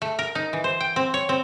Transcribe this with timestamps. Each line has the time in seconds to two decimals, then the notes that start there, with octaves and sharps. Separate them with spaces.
0.02 A3
0.19 A#4
0.35 D#4
0.53 E3
0.64 C5
0.80 G5
0.96 C4
1.14 C#5
1.29 C4